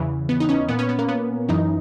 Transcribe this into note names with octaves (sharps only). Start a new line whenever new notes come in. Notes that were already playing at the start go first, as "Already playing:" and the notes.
Already playing: E2 C#3 E3
B3
D#4
C#4
A#2 B3
C#4
B3
A#3
B3
F#2 E3 D#4